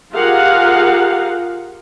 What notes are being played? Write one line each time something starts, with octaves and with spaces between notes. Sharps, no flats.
F4 G4 G#4 A#4 F5 F#5